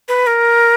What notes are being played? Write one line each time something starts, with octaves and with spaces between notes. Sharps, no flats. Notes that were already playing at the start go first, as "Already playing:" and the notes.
B4
A#4